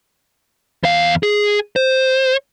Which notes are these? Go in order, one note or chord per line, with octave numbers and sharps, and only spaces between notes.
E2 F5
G#4
C5